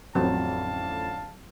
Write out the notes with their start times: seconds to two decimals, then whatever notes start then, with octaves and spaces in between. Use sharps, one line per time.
0.15 A1 F2 D3 F#3 C4 F5 A5